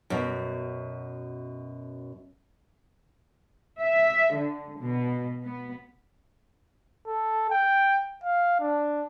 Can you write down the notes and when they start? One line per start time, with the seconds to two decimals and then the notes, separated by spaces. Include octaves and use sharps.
0.10 F#2 B2
3.80 E5
4.35 D3
4.79 B2
5.44 B3
7.07 A4
7.50 G5
8.24 F5
8.60 D4